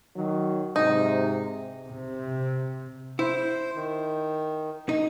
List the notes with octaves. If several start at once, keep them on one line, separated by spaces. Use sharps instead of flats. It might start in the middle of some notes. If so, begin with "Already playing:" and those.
D#3 F#3
G#2 C3 D#4
C3
E4 C5
D#3
D#4